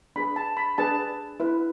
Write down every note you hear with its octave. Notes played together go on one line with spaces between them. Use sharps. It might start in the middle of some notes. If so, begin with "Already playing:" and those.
D4 G#4 B4 B5
A5
B5
D4 G#4 B4 A5
E4 B4